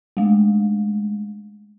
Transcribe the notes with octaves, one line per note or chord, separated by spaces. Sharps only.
G#3 A3